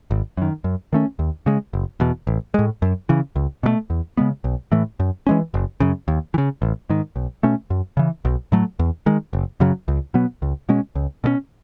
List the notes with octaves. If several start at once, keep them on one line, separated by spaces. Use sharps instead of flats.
G#1
F#2 D#3
F#2
D#3 A3 C#4
D#2
C#3 G#3
F#1
E2 B2
A1
A2 G#3
F#2
C#3 E3
C#2
B2 F#3 A3
E2
C#3 G#3 B3
B1
A2 E3 A3
F#2
E3 G#3 C#4
F#1
F#2 C#3
D#2
E3
C#3
A1
G#2 D#3
B1
B2 A3 C#4
F#2
C#3 E3
B1
A2 F#3 A3
E2
D#3 G#3
F#1
F#2 C#3 F#3
C#2
B2 F#3 B3
C#2
B2 G#3 C#4
C#2
B2 G#3 C#4